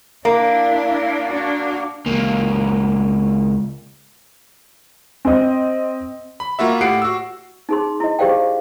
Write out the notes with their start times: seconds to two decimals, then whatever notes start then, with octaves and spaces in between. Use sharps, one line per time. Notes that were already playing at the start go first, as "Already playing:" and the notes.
0.25 A#3 D4 E4
1.27 D4 F#4
2.06 C#2 A#3
5.25 C4 D#5
6.40 B5
6.59 A#3 F4 F#4 E5
6.81 A2 G4 F#5 C7 D7
7.02 F#4 E6
7.69 D#4 G#4 C6
8.00 E4 D#5
8.19 G4 G#4 C5 D5 F5 G5